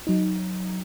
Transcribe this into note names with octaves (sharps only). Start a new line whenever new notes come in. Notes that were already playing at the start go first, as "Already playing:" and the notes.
F#3 D#4